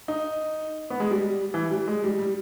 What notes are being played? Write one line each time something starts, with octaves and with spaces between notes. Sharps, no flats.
D#4
B3
G#3
G3
E3
G3
G#3
G3
G3